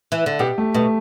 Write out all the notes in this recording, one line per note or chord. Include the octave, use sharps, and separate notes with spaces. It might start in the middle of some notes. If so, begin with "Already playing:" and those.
E3
D3
B2 G4
A3
B2 A3